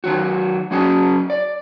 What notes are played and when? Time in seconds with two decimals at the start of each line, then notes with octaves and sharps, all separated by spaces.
0.04 D#3 F#3 F#4
0.71 F#3 C#4 F#4 G#4
1.30 D5